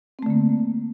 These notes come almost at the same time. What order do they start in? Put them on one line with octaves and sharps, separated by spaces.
C4 A3 D3 A#3